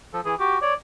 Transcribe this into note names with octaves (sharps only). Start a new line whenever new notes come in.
F3 A4
E3 G#4
F#4 G4
C#5 D5